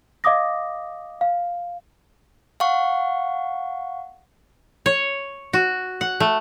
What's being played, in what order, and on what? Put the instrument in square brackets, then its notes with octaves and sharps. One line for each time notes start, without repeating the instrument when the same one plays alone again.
[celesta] D#5 F5 D6 D#6 A#6
F5
[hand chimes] F5 F#5 C#6
[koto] C#5
F#4
F#5
A3